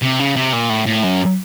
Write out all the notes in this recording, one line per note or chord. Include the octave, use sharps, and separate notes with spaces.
C3
C#3
C3
A#2
A2
A2
F#2